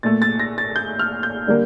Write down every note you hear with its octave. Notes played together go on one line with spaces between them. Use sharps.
A#2 A3 A6
A6
A#6
A6
G6
F6
G6
D3 G3 A#3